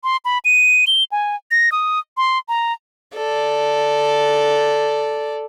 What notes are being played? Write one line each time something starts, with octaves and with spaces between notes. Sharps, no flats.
C6
B5
D#7
G7
G#5
A#6
D#6
C6
A#5
A4 D5